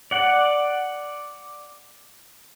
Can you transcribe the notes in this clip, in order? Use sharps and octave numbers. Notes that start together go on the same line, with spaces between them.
D5 F#5